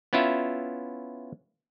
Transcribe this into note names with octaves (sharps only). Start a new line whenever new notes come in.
B3 C#4 E4 F4 E5